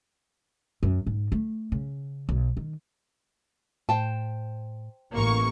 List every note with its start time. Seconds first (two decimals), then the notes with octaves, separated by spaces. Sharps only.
0.83 F#2
1.06 G#2
1.32 A3
1.72 C#3
2.29 B1
2.57 D#3
3.89 A2 C5 G5 A5
5.13 A1 A#3 C#6